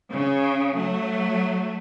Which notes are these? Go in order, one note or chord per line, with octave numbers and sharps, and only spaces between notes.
C#3
F#3 A3